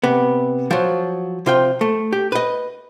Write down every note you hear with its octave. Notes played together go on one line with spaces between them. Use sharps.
C3 B3
F3 F#3
C3 F4 G5
A3
G4
B4 D#5